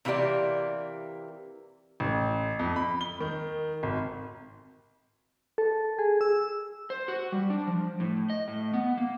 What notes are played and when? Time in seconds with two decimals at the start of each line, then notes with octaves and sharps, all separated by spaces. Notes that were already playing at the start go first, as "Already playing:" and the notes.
0.05 C3 E3 A#3 G4 D5
2.00 A1
2.59 F2
2.76 B5
3.01 G7
3.20 D#3
3.83 G#1
5.58 A4
5.99 G#4
6.21 E6
6.90 C5
7.08 F#4
7.32 G3
7.50 D4
7.67 F3
8.00 A2
8.30 D#5
8.48 A2
8.73 B3
8.97 A#3